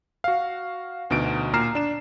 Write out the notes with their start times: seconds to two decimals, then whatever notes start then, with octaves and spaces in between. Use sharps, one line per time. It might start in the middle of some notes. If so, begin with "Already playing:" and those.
0.24 F#4 F5
1.10 D2 B2 D#4 D7
1.53 A#2 A#5 F6 C7 E7
1.75 D4 E7